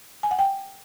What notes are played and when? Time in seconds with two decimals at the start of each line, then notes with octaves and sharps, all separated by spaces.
0.23 G#5
0.31 F#5
0.39 G5